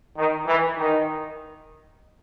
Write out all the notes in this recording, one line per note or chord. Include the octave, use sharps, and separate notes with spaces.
D#3
E3
D#3